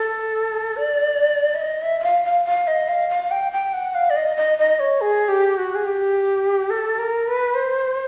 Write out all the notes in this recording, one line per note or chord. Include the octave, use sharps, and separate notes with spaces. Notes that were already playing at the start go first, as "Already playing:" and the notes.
Already playing: A4
D5
E5
D#5
E5
E5
F5
F5
F5
D#5
F5
F5
G5
G5
F#5
F5
D5
D#5
D#5
D#5
C#5
G#4
G4
F#4
G#4
G4
A4
A#4
B4
C5